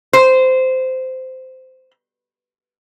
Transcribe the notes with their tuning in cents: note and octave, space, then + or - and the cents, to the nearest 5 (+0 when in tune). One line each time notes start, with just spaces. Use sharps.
C5 -15